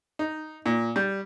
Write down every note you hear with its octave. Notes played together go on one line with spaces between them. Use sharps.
D#4
A#2
G3